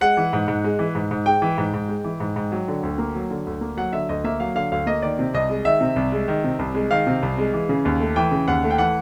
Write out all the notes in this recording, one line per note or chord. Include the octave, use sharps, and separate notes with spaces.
G#3 F#5
E3
G#2
G#2
G#3
E3
G#2
G#2
G#3 G5
E3
G#2
G#2
G#3
E3
G#2
G#2
F#3
D3
D2
A#3
F#3
D3
D2
A#3
F#3 F#5
D3 E5
D2 D#5
A#3 E5
F#3 F5
D3 F5
D2 F5
A#3 D#5
D#3 D5
C3
C2 D#5
G#3
D#3 E5
C3
C2
G#3
D#3
C3
C2
G#3
D#3 F5
C3
C2
G#3
E3
C#3
D#2
A3
E3 G5
C#3
D#2 F#5
A3
G5
E3 F#5